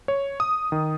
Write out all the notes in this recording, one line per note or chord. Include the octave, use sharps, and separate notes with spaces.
C#5
D#6
D#3